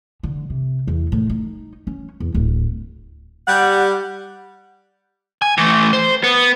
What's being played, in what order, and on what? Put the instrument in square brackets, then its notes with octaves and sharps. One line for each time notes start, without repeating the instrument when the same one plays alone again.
[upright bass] D3
C3
E2
A2
D#4
C#4
E2
D1
[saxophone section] G3 F#5
[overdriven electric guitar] G#5
E3 A3
C5
B3